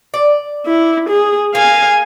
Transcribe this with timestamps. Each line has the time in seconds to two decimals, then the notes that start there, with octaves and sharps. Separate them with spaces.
0.14 D5
0.67 E4
1.09 G#4
1.55 A#3 G#4 F5 G#5